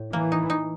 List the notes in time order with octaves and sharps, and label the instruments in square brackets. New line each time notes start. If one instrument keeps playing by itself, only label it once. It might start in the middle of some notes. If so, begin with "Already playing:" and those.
Already playing: [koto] A2
[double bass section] E3 [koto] A#3
[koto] D#4
D#4